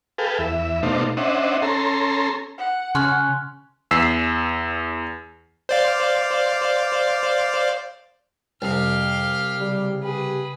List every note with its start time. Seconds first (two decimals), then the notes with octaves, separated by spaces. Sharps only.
0.18 G#4 A4 B4 F5 G5
0.39 E2 E5
0.83 B2 A3 D4 D#4 C5 F5
1.17 C#4 D4 C5 D#5 E5 F#5
1.62 C#4 A4 A#5 C6
2.58 F#5
2.95 C#3 C#4 C6 F#6
3.91 E2 E6 B6 C7
5.69 C5 D5 F5
8.62 C2 F2 G4 F5
9.59 C#3 G3
10.03 G4 G#4 B4